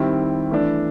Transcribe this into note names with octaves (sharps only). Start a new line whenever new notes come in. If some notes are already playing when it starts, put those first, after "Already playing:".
Already playing: D#3 G3 C4 E4
E3 A3 D4